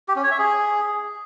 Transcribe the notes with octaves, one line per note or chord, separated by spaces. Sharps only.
G4
C#4
C#5
E5
G#4